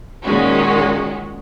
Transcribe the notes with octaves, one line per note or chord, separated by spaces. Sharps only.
A#2 D#3 G#3 C#4 F#4